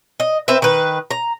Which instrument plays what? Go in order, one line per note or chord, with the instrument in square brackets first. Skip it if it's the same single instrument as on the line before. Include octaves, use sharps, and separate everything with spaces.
[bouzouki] D#5
C4 B4 C5 E5
D#3 B4
A#5